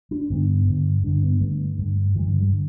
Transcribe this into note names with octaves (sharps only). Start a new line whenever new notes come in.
D4
G2 D3 B3
G2 D3
G2 D3 D4
B3
G2 D3 A3
G2 D3
G2 D3 E3
D3
G3
D3